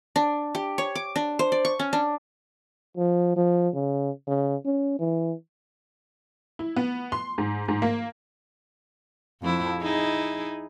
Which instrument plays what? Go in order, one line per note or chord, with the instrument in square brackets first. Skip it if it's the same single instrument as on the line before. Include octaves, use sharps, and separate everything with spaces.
[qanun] D4
G4
C#5
D6
D4
C5
D5
C#6
C#4
D4
[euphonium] F3
F3
C#3
C#3
C#4
E3
[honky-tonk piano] E4
B3
C6
G#2
G#2
A#3
[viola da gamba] F2 F3 E4
D#4 E4 G#4